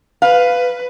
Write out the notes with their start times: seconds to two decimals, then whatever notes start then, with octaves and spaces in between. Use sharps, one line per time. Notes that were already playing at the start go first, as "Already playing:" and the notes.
0.22 B4 F5